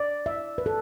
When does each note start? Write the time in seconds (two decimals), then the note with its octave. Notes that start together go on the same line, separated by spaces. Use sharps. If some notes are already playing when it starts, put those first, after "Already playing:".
Already playing: D5
0.26 E5
0.58 B4
0.66 A4